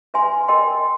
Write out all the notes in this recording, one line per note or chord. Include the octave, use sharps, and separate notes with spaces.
B4 E5 G#5 C6
A#4 D#5 G5 C6